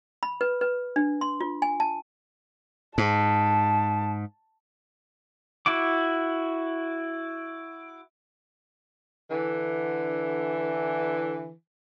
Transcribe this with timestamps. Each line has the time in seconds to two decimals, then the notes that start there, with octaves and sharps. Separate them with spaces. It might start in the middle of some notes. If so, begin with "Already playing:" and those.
0.23 B5
0.41 B4
0.61 B4
0.96 D4
1.21 C6
1.41 F4
1.62 G#5
1.80 A5
2.98 G#2 A5
5.66 E4 F#4 D6
9.30 D3 E3